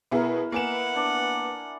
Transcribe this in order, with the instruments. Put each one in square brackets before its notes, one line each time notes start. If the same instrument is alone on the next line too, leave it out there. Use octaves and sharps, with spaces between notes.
[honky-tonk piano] B2 B3 G#4 [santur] E4 A#4
[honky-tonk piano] A#3 B3 E7 [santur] E5 G#5 [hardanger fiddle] F#5
[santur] D4